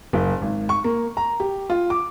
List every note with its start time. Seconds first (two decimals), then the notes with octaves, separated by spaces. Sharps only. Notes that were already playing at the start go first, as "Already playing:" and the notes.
0.13 F#1
0.42 G#1
0.69 C#6
0.84 A#3
1.17 A#5
1.40 G4
1.70 F4
1.90 D6